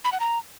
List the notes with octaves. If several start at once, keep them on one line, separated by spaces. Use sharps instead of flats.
B5
F#5
A#5